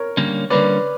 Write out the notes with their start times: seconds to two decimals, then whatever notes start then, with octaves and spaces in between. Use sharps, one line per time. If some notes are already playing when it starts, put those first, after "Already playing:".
Already playing: A#4 C#5
0.17 D3 G3 A#3 C#4
0.50 D3 G3 A#3 C#4 B4 D5